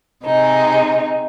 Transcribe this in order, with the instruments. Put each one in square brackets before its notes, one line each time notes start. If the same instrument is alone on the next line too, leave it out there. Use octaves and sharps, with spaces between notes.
[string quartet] C3 G#3 D#4